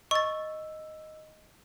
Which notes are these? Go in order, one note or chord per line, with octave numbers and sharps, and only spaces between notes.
D#5 C#6 E6 A6